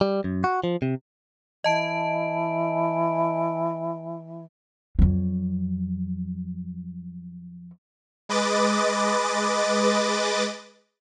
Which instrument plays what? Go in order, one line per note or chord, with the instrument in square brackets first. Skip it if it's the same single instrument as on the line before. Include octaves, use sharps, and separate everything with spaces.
[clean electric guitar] G3
F#2
F#4
F3
C3
[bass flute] E3 [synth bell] D#5 A5 D7
[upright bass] F2 F#3
[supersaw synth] G#3 B4 D#5 D6 A6